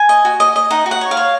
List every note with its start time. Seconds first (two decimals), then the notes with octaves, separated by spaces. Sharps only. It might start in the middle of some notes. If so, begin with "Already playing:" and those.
Already playing: G#5
0.09 D#5
0.25 F#4
0.40 D#5
0.56 D#5
0.71 D#4 F#5
0.86 F#4
0.91 F#5
1.01 C#5
1.11 F5
1.17 C#5